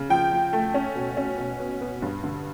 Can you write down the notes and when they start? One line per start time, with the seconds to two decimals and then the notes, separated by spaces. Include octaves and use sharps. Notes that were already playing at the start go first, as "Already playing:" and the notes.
Already playing: C#3
0.09 F3 G5
0.31 F3
0.53 A3
0.74 C#4
0.95 B2
1.17 C#4
1.38 B2
1.60 B3
1.81 B3
2.02 G2
2.23 D3